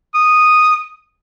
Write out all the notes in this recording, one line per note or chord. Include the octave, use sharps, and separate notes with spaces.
D#6